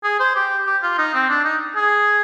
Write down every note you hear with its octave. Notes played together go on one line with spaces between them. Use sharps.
G#4
C5
G4
G4
F4
D#4
C4
D4
D#4
G#4